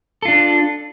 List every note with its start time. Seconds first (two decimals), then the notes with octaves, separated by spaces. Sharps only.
0.22 A4
0.25 F4
0.28 D4